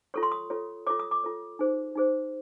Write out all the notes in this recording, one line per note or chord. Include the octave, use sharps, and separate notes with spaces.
F4 A4 C#5 C#6
C6
D#6
F4 A4 C#5
F4 A4 C#5 D6
D#6
D6
F4 A4 C#5
D#4 G#4 C5
D#4 G#4 C5